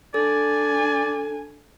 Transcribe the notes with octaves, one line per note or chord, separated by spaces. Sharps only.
D4 A4 D5 G#5